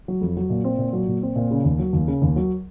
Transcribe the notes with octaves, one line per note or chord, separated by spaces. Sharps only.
F#3
F2
F#3
A#2
C4
A#2
F#3
A#2
C4
A#2
C#3
D#2
F#3
D#2
C#3
D#2
F#3